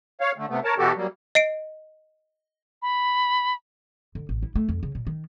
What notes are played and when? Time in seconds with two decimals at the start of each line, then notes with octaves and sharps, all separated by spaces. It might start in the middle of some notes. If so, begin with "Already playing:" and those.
0.21 C#5 F5
0.38 D3 A3
0.49 C3 A3 B3
0.64 A#4 C#5 A5
0.79 B2 E3 B3 F#4 G4 A4
0.96 F#3 G3 A#3
1.35 D#5 C7 D7
2.82 B5
4.15 D3
4.29 A1
4.43 E4
4.55 A3
4.69 F2
4.83 C#3
4.95 A#2
5.07 D#3